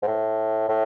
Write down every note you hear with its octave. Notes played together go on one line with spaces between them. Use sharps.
G#2
A2
A2